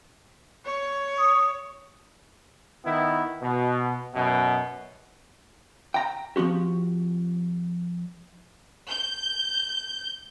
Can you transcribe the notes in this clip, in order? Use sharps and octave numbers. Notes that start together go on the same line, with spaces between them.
C#5
D#6
D#3 B3 E4
B2
F#2 B2
G5 A#5
F3 C4 F#4 G4
G6